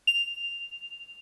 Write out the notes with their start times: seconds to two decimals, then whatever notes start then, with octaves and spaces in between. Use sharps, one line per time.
0.07 F7